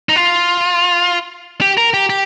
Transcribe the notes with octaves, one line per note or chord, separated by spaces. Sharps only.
D#4
F4
G4
A#4
G4
G4